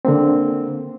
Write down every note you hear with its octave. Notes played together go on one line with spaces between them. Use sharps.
D3 A#3 C4